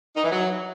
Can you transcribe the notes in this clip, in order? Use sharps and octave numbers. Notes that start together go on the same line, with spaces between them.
D#4
E3
F#3